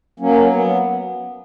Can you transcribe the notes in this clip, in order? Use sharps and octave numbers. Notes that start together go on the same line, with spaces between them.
F#3 A#3 C#4
B3